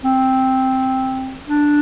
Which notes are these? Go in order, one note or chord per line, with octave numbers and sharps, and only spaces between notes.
C4
D4